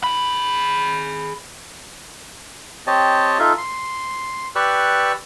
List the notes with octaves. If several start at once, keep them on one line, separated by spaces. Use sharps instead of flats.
G#4 B5
C4 G4 C#5 D#5 A5
D#4 F4 A4 E5 F5
C6
G4 B4 D5 C#6 E6 F#6